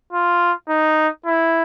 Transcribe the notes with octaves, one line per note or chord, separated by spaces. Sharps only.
F4
D#4
E4